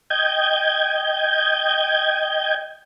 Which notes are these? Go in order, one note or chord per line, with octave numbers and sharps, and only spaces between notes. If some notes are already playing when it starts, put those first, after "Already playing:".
D#5 G5 G6 G#6